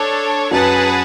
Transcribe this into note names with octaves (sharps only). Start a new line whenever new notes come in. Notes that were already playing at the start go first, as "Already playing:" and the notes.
Already playing: D4 A4 C#5
F#2 F#3 G#4 B4 F#5 A5